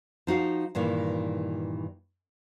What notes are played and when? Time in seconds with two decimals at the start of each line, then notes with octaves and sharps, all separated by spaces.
0.27 F3 D#4 F#4 F5
0.75 G2 A#2 D#3 E3